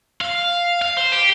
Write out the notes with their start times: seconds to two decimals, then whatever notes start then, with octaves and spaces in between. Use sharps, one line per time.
0.21 F5
0.82 F5
0.97 C5
1.12 G4